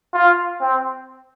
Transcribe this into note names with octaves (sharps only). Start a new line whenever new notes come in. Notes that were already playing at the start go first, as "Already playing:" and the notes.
F4
C4